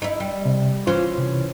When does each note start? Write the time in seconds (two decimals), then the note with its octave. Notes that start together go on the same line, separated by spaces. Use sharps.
0.02 D#4 E4
0.20 G3
0.45 C3
0.87 E3 C#4 F4 C5
1.18 C3